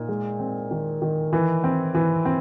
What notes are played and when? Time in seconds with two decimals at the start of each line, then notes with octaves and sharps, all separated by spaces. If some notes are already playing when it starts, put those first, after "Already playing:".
Already playing: A#2 D#4
0.09 G#3
0.40 C4
0.71 D#3
1.02 D#3
1.33 E3
1.64 C4
1.95 E3
2.25 C4